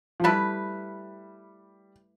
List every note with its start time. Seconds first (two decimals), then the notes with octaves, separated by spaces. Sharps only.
0.20 F3
0.24 G3 A3 E4 B4